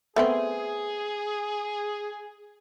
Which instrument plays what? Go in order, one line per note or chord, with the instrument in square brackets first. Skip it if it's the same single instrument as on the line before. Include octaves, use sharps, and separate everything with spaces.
[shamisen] A3 B3 C4 [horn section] G#4